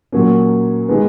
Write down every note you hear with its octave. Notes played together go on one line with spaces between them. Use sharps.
A#2 F#3 A#3 C#4
D#3 G#3 B3